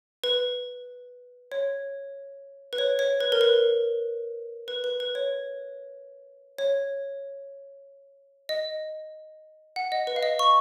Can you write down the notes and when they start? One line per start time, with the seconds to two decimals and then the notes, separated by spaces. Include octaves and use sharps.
0.24 B4
1.52 C#5
2.73 B4
2.78 C#5
2.99 C#5
3.20 B4
3.32 A#4
3.41 B4
4.68 B4
4.84 B4
5.00 B4
5.15 C#5
6.58 C#5
8.49 D#5
9.76 F#5
9.92 D#5
10.07 B4
10.16 F5
10.23 D#5
10.39 C#6